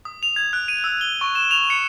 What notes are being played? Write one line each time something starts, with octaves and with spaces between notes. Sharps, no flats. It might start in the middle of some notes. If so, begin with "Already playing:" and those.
D#6
F7
G#6
F#6
D#7
E6
G7
C#6
E7
F7
C#7